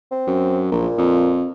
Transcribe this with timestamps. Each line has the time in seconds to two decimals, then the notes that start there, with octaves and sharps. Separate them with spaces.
0.11 C4
0.27 F#2
0.72 A#1 A#2
0.98 F2